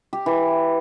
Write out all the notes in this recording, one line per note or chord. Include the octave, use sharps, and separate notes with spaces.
G4
E3